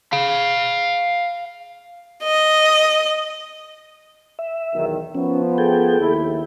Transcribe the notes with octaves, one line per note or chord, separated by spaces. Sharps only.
F5 B5
D#5
E5
B1 E2 D#3
F3 B3 C#4
G#4 A4 G5
D#2 E4